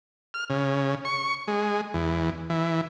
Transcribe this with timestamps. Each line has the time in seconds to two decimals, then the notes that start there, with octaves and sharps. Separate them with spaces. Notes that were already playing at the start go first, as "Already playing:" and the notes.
0.34 F6
0.50 C#3
1.05 C#6
1.48 G#3
1.94 E2
2.50 E3